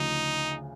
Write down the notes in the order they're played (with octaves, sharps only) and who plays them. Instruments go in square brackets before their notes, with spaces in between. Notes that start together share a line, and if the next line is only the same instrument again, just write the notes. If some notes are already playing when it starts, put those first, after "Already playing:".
Already playing: [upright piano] D2 C#3 F3 [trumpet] D#4